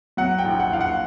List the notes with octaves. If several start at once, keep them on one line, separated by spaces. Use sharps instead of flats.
F#3 F#5
G5
A#1
F#5
A#1 F5
F#5